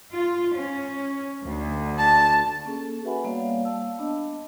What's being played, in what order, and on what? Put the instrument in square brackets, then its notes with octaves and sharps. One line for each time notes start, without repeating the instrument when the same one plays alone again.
[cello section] F4
C#4
D2
[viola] A5
[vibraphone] A#3 C#4 G#4 A4
F#4 B4 E5 F#5 G#5 B5
G3 A#3 B3 C#5 D5 F5
F5 A5 E6
B3 D4 D#5 A5